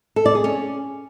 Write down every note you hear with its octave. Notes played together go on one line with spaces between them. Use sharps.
A4
D5
G#4
C#4